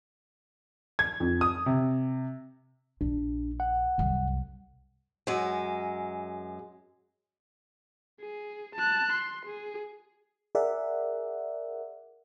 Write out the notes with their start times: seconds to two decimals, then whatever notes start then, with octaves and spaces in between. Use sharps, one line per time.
0.99 G#6
1.20 F2
1.41 D#6
1.66 C3
3.01 A#1 D4
3.60 F#5
3.98 C2 F#2
5.27 F#2 G#3
8.20 G#4
8.75 A5 F#6
9.12 C6
9.45 G#4
10.55 G#4 A#4 D5 E5 F#5